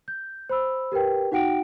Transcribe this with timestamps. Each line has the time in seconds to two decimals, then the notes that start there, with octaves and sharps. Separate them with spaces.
0.08 G6
0.50 C5 B5 E6
0.92 G4 A#4 B4 G5
1.32 D#4 F#4 F#5 G5 D7